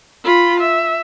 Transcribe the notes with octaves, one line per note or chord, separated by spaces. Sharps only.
F4 B5
E5